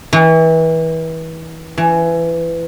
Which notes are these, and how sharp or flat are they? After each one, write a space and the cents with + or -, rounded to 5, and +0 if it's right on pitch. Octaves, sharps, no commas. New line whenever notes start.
E3 -30
E3 +20